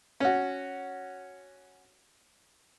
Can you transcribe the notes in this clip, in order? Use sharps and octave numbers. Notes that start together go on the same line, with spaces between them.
C#4 F#4